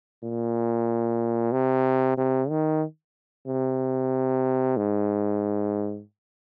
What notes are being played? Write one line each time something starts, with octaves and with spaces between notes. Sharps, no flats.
A#2
C3
C3
D#3
C3
G#2